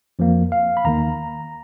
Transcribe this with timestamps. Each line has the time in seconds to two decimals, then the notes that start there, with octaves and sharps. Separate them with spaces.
0.19 F2 F3 A#3
0.52 F5
0.77 B5
0.84 D#2 D#3 A#3 A#5